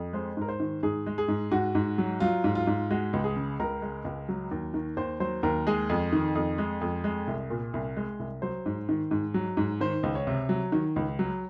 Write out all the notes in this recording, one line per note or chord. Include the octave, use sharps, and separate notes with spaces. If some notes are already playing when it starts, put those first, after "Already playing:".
Already playing: F2
G#3 C5
G#2 A#4
C5
D#3
G#2 G#4
G#3
G#4
G#2
G#2 F#4
G#2
F#3
F#3 F4
G#2
F4
G#2
G#3 F#4
C#2
G#4
C#3
C#2 A#4
G#3
C#2
F#3
D#2
D#3
D#2 C5
F#3 C5
D#2 A#4
G#3 G#4
F2
D#3
F2
G#3
F2
G#3
C2
A#2
C2
G#3
C2
F#3 C5
G#2
D#3
G#2
F#3
G#2
D#3 C5
C#2
C#5
C3
F#3
D#3
C#2
F#3